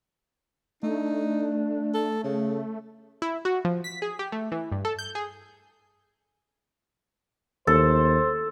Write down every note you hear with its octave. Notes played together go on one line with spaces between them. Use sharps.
A3 D4 D#4
A4
C#3
E4
F#4
F3
B6
G#4
G4
A3
E3
G2
A4
G6
G#4
D#2 A4 C5